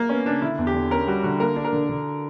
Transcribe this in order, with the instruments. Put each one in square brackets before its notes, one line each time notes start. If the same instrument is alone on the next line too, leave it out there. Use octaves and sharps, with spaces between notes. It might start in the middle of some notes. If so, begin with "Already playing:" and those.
Already playing: [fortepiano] A#3
[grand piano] B3 [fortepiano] C#4
[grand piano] C#3 [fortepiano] D4
[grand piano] D3 [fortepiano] E4
[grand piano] E2
[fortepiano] G4
[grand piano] D3
[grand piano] C#4 [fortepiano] A#4
[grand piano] G3 [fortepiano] F#4
[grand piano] D3 [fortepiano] F#4
[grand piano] A#3 [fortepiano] A#4
[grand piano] D4
[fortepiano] A#4
[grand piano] D3
D3